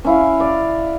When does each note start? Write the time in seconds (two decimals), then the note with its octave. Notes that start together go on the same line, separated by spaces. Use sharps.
0.04 C#4 E4 F5
0.40 D5